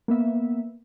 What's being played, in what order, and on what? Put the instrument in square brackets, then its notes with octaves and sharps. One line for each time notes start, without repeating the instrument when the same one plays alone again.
[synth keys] A#3 B3 E5